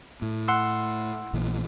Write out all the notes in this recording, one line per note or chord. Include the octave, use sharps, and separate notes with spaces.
A2
F#5 C6 E6
A#1 A#2 E3